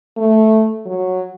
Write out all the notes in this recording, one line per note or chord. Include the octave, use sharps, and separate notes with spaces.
A3
F#3